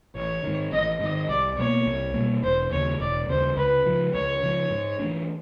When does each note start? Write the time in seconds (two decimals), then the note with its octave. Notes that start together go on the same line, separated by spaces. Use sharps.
0.15 A1 C#5
0.44 G#2 D#3
0.72 A1 D#5
1.00 G#2 D#3 D#5
1.29 C2 D5
1.57 B2 G3 A#3 C#5
1.87 C2
2.14 B2 G3 A#3
2.43 E1 C5
2.71 D#2 C#3 C#5
3.00 E1 D5
3.28 D#2 C#3 C5
3.57 C#2 B4
3.86 C#3 F3
4.14 C#2 C#5
4.43 C#3 F3
4.71 G#2
4.99 E3 A3 D4